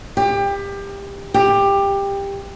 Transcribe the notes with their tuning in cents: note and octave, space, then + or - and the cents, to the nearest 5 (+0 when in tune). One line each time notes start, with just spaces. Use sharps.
G4 +25
G4 +15